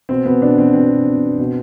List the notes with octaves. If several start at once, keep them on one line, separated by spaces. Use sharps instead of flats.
B2 C4
B2 B3
B2 D4
B2 C4
B2 C4
B2
B2
B2
B2